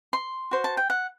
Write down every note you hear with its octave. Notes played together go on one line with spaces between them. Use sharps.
C6
F#4 C5
A5
G5
F#5